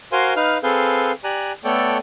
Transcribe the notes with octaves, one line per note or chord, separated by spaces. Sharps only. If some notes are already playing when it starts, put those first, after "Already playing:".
F#4 A#4 C5 F5 G#5 C6
D#4 B4 F5 F6
C4 G#4 A4 B4 F5 G6
G4 D5 G#5 A#5 F#6
A3 B3 A4 C#5 D5 G5